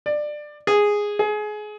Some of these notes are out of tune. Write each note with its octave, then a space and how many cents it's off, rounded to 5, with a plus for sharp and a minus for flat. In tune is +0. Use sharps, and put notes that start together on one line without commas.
D5 +20
G#4 -5
G#4 +25